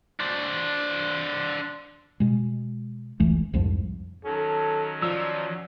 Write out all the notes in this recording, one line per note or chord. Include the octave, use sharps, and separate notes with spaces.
D4 C5
B2 G#3
F1 C#2 E3 A3
C2 F2 G#2 F3
D#3 F#3 C#4 A4
F3 D5 E6